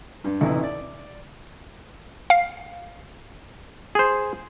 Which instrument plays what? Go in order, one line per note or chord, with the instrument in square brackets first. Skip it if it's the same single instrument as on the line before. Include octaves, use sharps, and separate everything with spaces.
[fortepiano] G2
A1 D2 C3 E3 D#4 E4
D5
[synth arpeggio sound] F5 C7
[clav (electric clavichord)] G#4 C5